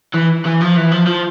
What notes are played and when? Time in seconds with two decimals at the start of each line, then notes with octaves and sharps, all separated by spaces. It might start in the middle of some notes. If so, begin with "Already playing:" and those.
0.14 E3
0.45 E3
0.61 F3
0.76 E3
0.91 F3
1.06 F3